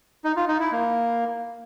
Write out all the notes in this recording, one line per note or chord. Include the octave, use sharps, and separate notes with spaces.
D#4
F4
D#4
E4
A#3